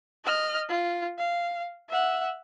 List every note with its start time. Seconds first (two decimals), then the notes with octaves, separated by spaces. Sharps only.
0.24 D#5 F6
0.69 F4
1.18 F5
1.89 E5 F#5